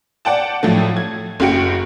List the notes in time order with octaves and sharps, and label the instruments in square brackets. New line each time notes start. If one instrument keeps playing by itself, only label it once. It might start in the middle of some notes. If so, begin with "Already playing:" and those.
[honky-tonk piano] D5 F#5 G5 A5
A2 F3 F#3 A3
G#6
F#1 F#2 F#4 G5 C#7